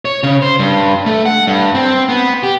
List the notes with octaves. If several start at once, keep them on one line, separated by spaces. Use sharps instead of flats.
C#5
C#3
C5
G2
A3
F#5
G2
C4
B3
G4